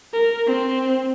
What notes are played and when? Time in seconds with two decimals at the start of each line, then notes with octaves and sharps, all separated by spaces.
0.13 A#4
0.47 C4